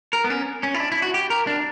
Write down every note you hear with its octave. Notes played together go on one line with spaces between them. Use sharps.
A#4
B3
C#4
C#4
E4
D4
E4
F#4
G4
A#4
D4